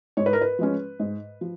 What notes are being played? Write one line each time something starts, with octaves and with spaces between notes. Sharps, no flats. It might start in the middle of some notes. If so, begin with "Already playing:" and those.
G#2 C#5
B4
A#4
B4
F3 G#3 C#4
G#2
F3